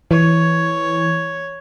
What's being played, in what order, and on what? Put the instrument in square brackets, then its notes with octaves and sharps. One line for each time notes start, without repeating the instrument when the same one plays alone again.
[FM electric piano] E3 [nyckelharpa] C#5